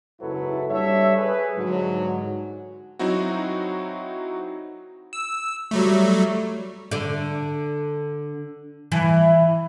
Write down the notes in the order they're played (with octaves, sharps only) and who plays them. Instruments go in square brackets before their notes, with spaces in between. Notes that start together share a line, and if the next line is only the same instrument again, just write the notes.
[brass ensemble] F#1 G#2 F#3 E4 A4 B4
G3 D4 A4 C#5 E5
G#4 B4
G#2 D3 F#3
[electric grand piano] F#3 C4 D#4 E4 F#4
[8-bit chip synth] E6
F#3 G3 A3
[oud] D3 D5
E3